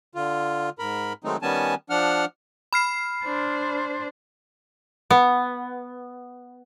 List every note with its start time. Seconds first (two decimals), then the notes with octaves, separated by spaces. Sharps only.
0.15 D3 F4
0.79 G#2 A#4 B5
1.24 D#3 F#3 G#3 A3 C4 D#4
1.42 D#3 G3 B3 C#4 G#5 A5
1.90 F3 D4 F#5 F6
2.73 B5 F6 C7
3.24 D4 C5
5.10 B3